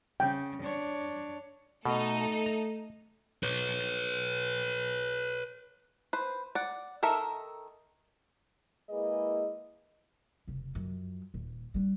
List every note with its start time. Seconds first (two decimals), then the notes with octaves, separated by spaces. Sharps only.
0.20 C#3 G5
0.62 D4 C#5
1.85 B2 A3 D#4 A4
2.46 A#5
3.43 B4 C#5
6.13 B4 C5
6.55 D5 F#5
7.03 D#3 A4 A#4 E5
8.89 G#3 A#3 E4 G#4 B4 D#5
10.47 F1 C#3
10.75 F#2 F3
11.34 D#1
11.74 G3 D4